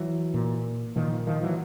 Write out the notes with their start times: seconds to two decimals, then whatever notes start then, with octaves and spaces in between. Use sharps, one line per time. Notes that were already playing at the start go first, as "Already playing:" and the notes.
Already playing: E3 F#3
0.34 A#2
0.96 A#2 D#3 F3
1.27 D#3 F3
1.43 E3 F#3